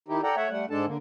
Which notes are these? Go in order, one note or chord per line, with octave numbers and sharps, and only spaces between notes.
D#3 D#4 E4 G4
A4 D5 F#5 G5 A#5
A3 C#5 E5 F#5
G3 A3 F#5
G#2 G#3 D4 A4 A5
D3 A#3